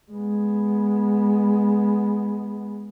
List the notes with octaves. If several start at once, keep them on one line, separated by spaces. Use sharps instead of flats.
G#3 B3